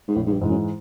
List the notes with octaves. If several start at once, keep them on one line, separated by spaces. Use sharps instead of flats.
G#2
A#1 A2
G#2
G2
G#2 E3 G#3
F#2